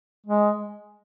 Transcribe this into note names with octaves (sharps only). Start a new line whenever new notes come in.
G#3